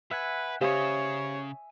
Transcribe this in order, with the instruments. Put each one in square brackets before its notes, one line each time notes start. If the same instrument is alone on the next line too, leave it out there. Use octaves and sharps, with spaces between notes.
[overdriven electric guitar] B4 [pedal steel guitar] E5 F#5 G#5
[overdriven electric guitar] C#3 [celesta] G4 C5 F5 [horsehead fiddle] C#5 [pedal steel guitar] E5 G#5 D#6